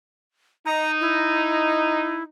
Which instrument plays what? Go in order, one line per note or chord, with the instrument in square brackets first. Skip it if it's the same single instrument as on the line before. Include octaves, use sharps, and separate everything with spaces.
[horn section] D#4 [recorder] A#5
[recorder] E4